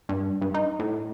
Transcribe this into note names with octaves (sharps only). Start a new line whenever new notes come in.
G2
G2
D#4
A2